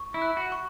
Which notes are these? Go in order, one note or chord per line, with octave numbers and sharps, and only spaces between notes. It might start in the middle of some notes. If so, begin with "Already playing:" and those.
Already playing: C#6
E4
F#6
F#4
C#6